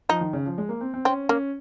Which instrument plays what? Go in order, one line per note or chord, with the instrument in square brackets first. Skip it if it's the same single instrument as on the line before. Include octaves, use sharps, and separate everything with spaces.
[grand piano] F3 [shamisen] D#4
[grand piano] D#3
C#3
F3
G#3
A#3
C4
C4
[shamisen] C4 [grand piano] C#4
[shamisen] A#3 [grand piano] C#4